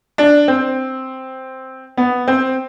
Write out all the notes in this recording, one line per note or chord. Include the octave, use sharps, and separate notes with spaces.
D4
C4
B3
C4